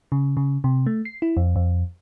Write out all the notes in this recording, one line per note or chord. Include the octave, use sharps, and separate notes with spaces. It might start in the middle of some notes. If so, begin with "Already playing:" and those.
C#3
C#3
C3
A3
C7
E4
F2
F2